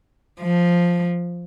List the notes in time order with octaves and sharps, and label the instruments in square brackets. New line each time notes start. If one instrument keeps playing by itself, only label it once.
[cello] F3